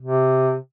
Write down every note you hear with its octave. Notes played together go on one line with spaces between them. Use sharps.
C3